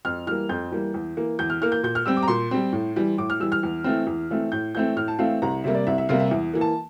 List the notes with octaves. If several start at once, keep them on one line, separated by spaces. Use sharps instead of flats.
F2 F6
E3 G3 A#3 F6
F2 G6
E3 G3 A#3
E2
E3 A#3
E2 G6
F6
E3 A#3 F6
G6
A#2 G6
F6
G3 C4 E6
D6
A#5
A#2 C6
G3 C4
A2
E3 G3
A2 D6
F6
E3 G3 E6
F6
E2
E3 A3 C4
E2
E3 A3 C4
A2 G6
E3 A3 C4 G6
A2 F6
A5
E3 A3 C4 F5
C2 A#5
C3 G3 A#3 E5
D5
C2 E5
E5
C3 G3 A#3 F5
E5
E2
E3 A#3
A5